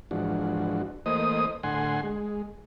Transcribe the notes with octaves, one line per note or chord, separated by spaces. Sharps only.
G#2 E3 F3 D4 F#4
E3 A3 A#3 C5 D#5 D#6
A2 D3 F#5 G#5 C6
G#3